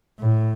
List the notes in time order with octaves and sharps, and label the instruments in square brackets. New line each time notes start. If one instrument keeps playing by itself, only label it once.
[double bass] A2